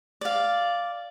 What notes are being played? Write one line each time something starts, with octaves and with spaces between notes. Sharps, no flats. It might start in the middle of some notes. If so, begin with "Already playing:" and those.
D5 F5